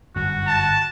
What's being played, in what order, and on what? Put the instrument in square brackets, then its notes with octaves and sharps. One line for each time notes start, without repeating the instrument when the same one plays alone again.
[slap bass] G1 F#2 [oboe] F#4
[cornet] A5